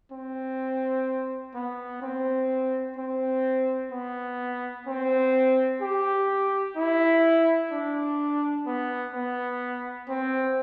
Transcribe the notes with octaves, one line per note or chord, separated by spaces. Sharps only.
C4
B3
C4
C4
B3
C4
G4
E4
D4
B3
B3
C4